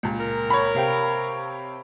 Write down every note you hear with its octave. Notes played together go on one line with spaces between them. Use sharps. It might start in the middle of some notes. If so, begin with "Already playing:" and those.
C#2 A#2
A#4
C#5 B5
C3 F5 G5